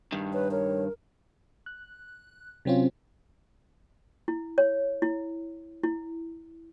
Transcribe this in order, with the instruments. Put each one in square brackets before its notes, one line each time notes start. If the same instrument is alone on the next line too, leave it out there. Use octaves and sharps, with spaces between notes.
[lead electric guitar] G2 D#3
[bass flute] B4 [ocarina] C#5
[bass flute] A#4 [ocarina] C#5
[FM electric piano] F#6
C3 F#3 C4 C#4 F4
[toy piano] E4
C#5
E4
E4